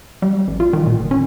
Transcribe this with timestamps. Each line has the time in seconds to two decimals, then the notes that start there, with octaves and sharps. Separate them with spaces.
0.22 G3
0.48 A1
0.60 F4
0.73 D#3
0.86 A#2
1.00 F#1
1.11 C#4